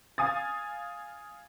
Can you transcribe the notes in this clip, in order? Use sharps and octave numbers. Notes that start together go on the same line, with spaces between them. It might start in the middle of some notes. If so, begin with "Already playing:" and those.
F5 G#5 D#6 A6